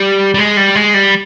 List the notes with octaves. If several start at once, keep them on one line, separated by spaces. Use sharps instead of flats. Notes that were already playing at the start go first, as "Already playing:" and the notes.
Already playing: G3
G3
G#3
G3
G#3
G3